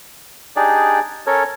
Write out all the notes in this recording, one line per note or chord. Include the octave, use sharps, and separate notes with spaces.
D4 D#4 G4 G#4 D5
C#4 A4 A#4 C#5